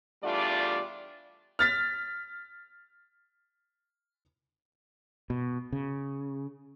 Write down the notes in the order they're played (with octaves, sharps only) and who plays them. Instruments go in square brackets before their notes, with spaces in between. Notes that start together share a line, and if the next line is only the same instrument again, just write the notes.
[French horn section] E2 G3 A3 D4 F4 D5
[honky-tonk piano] F6 A6 B6
[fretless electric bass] B2
C#3